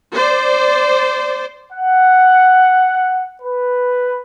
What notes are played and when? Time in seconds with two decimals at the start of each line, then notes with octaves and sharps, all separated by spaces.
0.14 C5 D5
1.70 F#5
3.42 B4